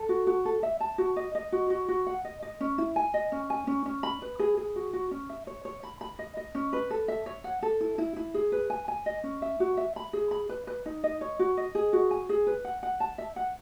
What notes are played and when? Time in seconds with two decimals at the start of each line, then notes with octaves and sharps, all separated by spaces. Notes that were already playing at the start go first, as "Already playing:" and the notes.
Already playing: A4
0.09 F#4
0.27 F#4
0.45 A4
0.63 E5
0.80 A5
0.98 F#4
1.16 D#5
1.35 D#5
1.52 F#4
1.70 F#4
1.88 F#4
2.06 F#5
2.25 D#5
2.42 D#5
2.60 C#4
2.78 E4
2.96 G#5
3.14 D#5
3.32 C#4
3.50 G#5
3.67 C#4
3.86 C#4
4.03 B5
4.22 B4
4.39 G#4
4.57 G#4
4.76 F#4
4.93 F#4
5.11 C#4
5.29 E5
5.47 C#5
5.65 C#5
5.83 B5
6.01 B5
6.19 D#5
6.37 D#5
6.55 C#4
6.73 B4
6.90 A4
7.08 E5
7.26 C#5
7.44 F#5
7.62 A4
7.80 E4
7.98 E4
8.16 E4
8.34 G#4
8.52 B4
8.70 G#5
8.88 G#5
9.06 D#5
9.23 C#4
9.42 E5
9.60 F#4
9.77 E5
9.96 B5
10.13 G#4
10.31 B5
10.49 B4
10.67 B4
10.86 D#4
11.04 D#5
11.21 C#5
11.39 F#4
11.57 D#5
11.75 G#4
11.93 F#4
12.11 G#5
12.29 G#4
12.47 B4
12.65 F#5
12.83 F#5
13.00 A5
13.18 E5
13.36 F#5